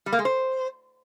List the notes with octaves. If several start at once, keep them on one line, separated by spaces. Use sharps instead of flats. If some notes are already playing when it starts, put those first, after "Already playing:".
G3
A#3
G#3
C5